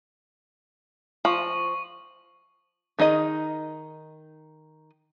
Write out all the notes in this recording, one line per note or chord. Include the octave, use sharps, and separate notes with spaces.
F3 C#6 F#7
D#3 D#4 G#4 D#5